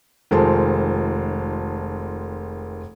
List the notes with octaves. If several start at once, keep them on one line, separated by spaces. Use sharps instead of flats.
F1 D#3 G#3 F4 C5 A5